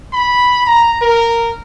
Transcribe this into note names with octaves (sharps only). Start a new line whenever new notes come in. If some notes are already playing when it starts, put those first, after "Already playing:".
B5
A#5
A#4